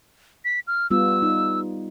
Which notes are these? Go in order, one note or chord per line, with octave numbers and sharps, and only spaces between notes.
B6
F6
G3 B3 F4 E6
D#4